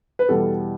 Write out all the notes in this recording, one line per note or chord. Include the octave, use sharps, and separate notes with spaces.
B4
E2 B2 G3 A4